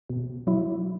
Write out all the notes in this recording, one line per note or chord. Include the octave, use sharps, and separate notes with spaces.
B2
F#3 E4